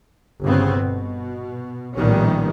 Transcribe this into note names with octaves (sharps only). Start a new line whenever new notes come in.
G1 C#3 B3 C4
B2
A#1 A2 D#3 G3 B3 C#4